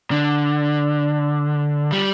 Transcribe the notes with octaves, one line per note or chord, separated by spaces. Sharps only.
D3
G3